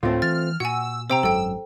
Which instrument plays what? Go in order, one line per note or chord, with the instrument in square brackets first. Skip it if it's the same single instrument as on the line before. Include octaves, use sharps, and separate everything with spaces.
[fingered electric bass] D2 [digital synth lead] A2 [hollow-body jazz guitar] A3 C4 F4
[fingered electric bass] E3 [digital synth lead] F6 [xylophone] A6
[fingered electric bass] A#2 [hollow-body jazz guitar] F#4 [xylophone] F#5 G#5 [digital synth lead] E6
[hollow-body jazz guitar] C3 [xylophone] C5 G5 A#5 [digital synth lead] E6
[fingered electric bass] G#1 [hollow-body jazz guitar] F#2 [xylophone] A4 G5